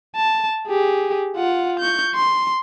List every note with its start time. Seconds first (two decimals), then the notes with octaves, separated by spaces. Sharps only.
0.16 A5
0.68 G4 G#4
1.36 F4 F#5
1.79 C#6 G6
2.15 C6